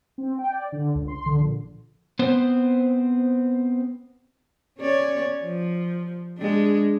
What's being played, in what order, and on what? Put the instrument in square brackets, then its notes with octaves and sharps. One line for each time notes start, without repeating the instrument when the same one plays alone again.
[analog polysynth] C4
G5
D5
D3
C#2
C6
D3
A#1
[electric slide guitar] B3 C4 C5
[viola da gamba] C#4 C#5 D5
F3
G#3 D4